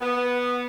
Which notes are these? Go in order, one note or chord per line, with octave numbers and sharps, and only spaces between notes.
B3